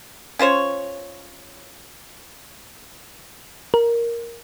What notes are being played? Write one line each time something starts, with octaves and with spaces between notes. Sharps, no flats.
C#4 F4 C5 C#5
A#4